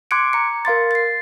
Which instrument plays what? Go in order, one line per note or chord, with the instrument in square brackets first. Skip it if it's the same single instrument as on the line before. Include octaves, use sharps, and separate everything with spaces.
[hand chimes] C6 D6 F#6 G#6 C#7 D7
A#5 C#7
A#4 F5 C6 A6
A6 C7